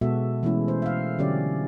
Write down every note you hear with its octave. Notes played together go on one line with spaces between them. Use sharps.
B2 G#3 B3 F#4 A4 E5
E3 G#3 A3 B3 C#4 E4
C5
E5 F5
D3 F#3 C#4 G4 D5